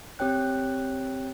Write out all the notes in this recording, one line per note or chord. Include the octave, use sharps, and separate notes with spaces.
C4 G4 C#5 G5 F#6